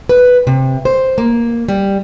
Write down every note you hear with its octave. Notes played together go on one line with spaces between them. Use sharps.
B4
C3
C5
A#3
G3